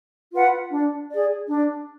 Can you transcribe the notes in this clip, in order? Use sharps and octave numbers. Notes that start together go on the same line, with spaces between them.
F4 B4 F#5
D4
G#4 D5
D4